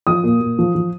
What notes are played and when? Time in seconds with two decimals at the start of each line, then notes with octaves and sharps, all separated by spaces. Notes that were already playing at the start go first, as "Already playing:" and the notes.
0.07 F3 D#6
0.24 A#2
0.40 A#2
0.59 F3
0.75 F3